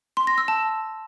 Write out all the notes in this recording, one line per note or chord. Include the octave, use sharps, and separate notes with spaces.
C6
A#6
E6
A5